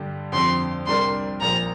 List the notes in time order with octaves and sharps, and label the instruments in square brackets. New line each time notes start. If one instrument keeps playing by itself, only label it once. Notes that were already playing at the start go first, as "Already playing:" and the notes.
Already playing: [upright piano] G2 D3 G3 D4 G4
[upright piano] F2 D3 F3 C4 [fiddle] C6
[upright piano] C2 C3 G3 D4 A#4 [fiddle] C6
[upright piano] A#1 A#2 F3 [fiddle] A#5